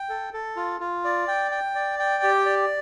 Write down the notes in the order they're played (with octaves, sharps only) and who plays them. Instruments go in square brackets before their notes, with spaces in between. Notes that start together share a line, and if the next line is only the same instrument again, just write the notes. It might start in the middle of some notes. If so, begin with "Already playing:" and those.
Already playing: [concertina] G5
A4
A4
F4
F4
D5
G5
G5
D5
G5
G4
D5